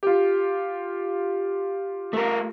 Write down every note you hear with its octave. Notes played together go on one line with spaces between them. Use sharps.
F4 G4
A3 A#4